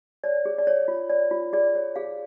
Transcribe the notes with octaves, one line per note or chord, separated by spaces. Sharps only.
C#5 D5
G#4
D5
C#5
F4
C#5 D5
F4
G#4 D5
C#5
G#4 F5